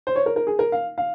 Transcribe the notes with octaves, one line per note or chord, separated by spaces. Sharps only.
C5
C#5
A#4
A#4
G#4
A#4
F5
F5